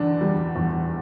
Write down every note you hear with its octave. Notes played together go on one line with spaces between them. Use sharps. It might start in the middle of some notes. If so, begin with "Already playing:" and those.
Already playing: E2 D3 D4
G3
E2